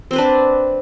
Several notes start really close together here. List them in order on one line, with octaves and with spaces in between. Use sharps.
C4 C5 B4 D4